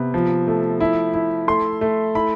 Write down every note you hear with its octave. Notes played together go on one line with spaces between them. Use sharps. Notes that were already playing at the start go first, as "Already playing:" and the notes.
Already playing: C3 B3
F3
A3
E4
E4
A3 C6
A3
E4 B5